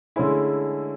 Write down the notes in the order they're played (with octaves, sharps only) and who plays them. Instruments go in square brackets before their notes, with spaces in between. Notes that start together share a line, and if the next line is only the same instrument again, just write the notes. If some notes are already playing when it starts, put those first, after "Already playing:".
[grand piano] D3 A3 C#4 E4 [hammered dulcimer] G#3